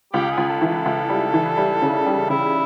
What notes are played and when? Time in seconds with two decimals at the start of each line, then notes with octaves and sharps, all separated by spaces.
0.13 C#2 G4
0.31 G#4
0.37 C#2
0.49 A4
0.62 E3
0.67 A4
0.86 C#2
1.09 G3
1.34 E3
1.57 G3
1.82 C#3
2.06 G3
2.30 C#3 E4